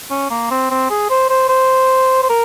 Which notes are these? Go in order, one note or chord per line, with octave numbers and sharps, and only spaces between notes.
C#4
A#3
C4
C4
G#4
C5
C5
C5
C5
A#4